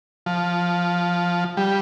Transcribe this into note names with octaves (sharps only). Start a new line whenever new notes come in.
F3
G3